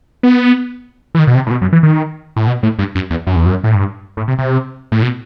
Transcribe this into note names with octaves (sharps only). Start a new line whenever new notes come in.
B3
E3
D#3
B2
C3
A2
B2
F#2
E3
D#3
A2
B2
A2
G2
F#2
E2
F#2
E2
F#2
A2
G2
A2
C3
C3
A2
B2